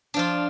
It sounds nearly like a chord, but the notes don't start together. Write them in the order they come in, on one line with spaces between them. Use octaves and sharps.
D4 F3 F4